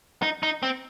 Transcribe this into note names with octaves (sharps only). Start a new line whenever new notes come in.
D#4
D#4
C4